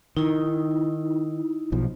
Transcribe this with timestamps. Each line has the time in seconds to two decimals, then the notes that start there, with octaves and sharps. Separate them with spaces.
0.17 D#3 D#4 E4
1.72 B1 B2 F3